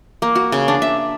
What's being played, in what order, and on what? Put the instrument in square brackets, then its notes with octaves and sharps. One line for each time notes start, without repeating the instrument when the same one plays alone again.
[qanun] A#3
F#4
C#3
D4
E5